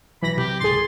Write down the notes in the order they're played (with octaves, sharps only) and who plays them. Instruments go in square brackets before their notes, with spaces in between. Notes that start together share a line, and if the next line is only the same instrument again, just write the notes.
[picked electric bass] B1 F#3 [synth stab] E3 A#6 [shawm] B5
[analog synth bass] C3 [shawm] G4
[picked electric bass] G#1 C#2 D#3 [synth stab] G#4 A6 [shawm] C6